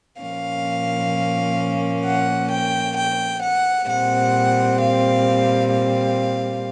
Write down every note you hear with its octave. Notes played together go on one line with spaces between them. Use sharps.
A#2 F3 A#3 C#4 F5
F#5
G5
G5
F#5
A#2 G3 C4 F#5
F5
F5